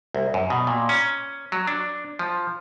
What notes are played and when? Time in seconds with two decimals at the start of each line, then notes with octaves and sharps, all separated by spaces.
0.14 C2
0.34 F#2
0.50 B2
0.67 A#2
0.89 C#4
1.52 F#3
1.68 D4
2.19 F3